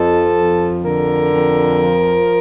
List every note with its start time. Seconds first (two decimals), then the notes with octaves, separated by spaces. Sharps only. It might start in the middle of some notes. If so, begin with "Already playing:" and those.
Already playing: F2 F3 A4
0.37 F2
0.84 D3 A#4
1.32 F2
1.80 F3